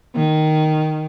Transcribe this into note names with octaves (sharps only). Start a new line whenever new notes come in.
D#3